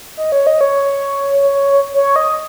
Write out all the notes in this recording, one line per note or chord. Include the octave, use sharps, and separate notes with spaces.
D#5
C#5
D#5
C#5
C#5
D#5